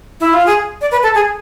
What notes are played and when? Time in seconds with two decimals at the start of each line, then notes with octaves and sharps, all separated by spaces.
0.20 E4
0.33 F4
0.46 G#4
0.81 D5
0.91 B4
1.03 A4
1.15 G#4